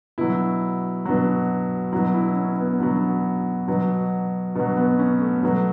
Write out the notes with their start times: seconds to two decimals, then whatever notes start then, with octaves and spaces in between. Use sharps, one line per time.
0.18 B2 F#3 E4
1.05 B2 F#3
1.92 B2 F#3 E4
2.15 E4
2.37 C#4
2.58 B3
2.80 B2 F#3 B3
3.68 B2 F#3
4.55 B2 F#3 B3
4.77 B3
4.99 C#4
5.22 A3
5.43 B2 F#3